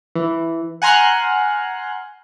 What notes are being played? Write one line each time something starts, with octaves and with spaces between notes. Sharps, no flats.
E3
F#5 G#5 A#5 C6 F6 F#6